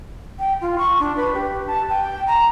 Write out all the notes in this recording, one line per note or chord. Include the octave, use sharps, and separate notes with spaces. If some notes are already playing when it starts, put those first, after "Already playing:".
G5
F4
C#6
D4
B4
G4
A5
G5
A#5